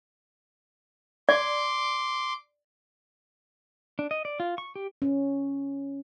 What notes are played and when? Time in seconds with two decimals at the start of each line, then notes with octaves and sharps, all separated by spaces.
1.29 D5 C6 D6
3.99 D4
4.11 D#5
4.25 D5
4.40 F4
4.58 C#6
4.76 G4
5.02 C#4